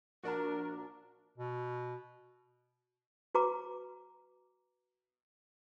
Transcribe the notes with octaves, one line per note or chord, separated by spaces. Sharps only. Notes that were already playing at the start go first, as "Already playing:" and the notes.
A#1 D4 F#4 A#4 A5 A#5
B2
F#4 B4 A#5 D6